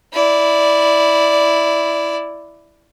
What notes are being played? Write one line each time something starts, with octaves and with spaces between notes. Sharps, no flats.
E4 D5